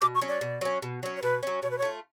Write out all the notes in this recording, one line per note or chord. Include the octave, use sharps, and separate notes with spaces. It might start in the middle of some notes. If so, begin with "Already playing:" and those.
B2 D6
C#6
F#3 C#4
D5
B2
F#3 C#4
B2
F#3 C#4
C#5
B2 B4
F#3 C#4
B2 C#5
B4
C#5
A3 F4